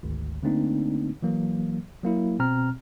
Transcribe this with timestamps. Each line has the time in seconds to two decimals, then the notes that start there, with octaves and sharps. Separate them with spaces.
0.03 G#1 D2
0.43 D3 A3 A#3 C4 D4 D#4
1.22 E3 F#3 A#3
2.03 F#3 A#3 E4
2.39 B2 C4 A#5 F6